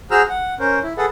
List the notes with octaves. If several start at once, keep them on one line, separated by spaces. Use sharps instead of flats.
F#4 G#4 C5 A#5 E6 F6
F#5
C#4 A#4 C5
E4
G#4 A4 B4 F#5